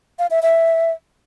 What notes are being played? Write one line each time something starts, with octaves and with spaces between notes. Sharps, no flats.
F5
E5
E5